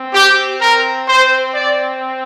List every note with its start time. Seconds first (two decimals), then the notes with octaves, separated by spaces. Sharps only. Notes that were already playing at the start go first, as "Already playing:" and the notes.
Already playing: C4
0.13 G4
0.60 A#4
1.07 C5
1.54 D5